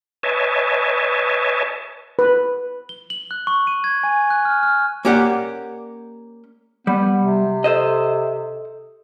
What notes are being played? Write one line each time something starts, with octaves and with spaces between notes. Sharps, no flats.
B4 C#5 D#5 E5 G#5 A5
B4
G7
F#7
F#6
C#6
D#7
G#6
G#5
F#6
F6
F6
A#3 C#4 G4 D5 F#5
G3 B3
C3
A4 C5 D#5